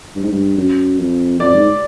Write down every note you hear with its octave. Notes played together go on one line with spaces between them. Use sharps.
G2
G#2
G2
F#2
F2
F2 D5
G#2